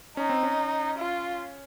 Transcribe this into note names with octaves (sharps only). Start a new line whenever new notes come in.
C#4 D#4
C4
C#4
F4